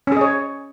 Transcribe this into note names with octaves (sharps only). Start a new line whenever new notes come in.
C#4 G#4 C#5 D#5